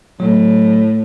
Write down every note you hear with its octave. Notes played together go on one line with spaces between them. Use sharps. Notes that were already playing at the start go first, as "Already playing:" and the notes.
A2 F#3